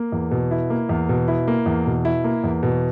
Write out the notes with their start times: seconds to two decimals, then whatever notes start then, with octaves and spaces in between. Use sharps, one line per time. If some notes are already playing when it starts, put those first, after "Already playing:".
Already playing: A#3
0.12 E2
0.31 B2
0.51 E4
0.70 A#3
0.89 E2
1.09 B2
1.28 E4
1.48 A#3
1.66 E2
1.86 B2
2.05 E4
2.24 A#3
2.44 E2
2.63 B2